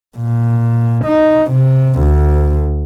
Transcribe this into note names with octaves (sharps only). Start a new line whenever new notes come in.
A#2
D#4
C3
D2